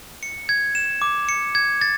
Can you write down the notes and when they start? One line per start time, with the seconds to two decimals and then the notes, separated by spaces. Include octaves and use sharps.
0.23 C#7
0.49 G#6
0.75 E7
1.02 D6
1.29 C#7
1.55 G#6
1.81 A6